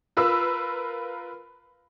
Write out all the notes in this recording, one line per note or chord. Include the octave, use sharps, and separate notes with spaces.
F4 A#4 B4 E6